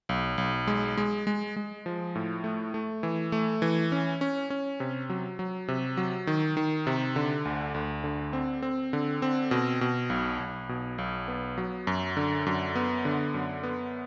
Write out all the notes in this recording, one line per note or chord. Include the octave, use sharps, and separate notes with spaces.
B1
B1
G#3
G#3
G#3
G#3
F3
A2
A3
A3
E3
A3
E3
C#4
C#4
C#4
C3
F#3
F#3
C3
F#3
D#3
D#3
C3
D3
D2
D2
D3
C4
C4
D3
C4
B2
B2
B1
B1
B2
B1
B3
F#3
F#2
D3
F#2
B3
D3
F#2
B3